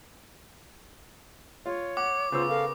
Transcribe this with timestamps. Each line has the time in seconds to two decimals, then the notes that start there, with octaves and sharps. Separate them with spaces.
1.66 F4 C#5
1.97 F#5 D6
2.32 C#3 B3 F4 C5 E6
2.49 A4 A#4 F5